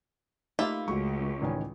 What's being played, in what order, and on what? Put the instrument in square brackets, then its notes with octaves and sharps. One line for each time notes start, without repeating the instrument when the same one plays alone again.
[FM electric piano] A3 B5 [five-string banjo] A#3 F4 E5 [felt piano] D#4 G4 F5
[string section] C#2 [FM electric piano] G#3 A3 F#4 [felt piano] C#6
[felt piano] A1 D#3 G#5 [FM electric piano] D5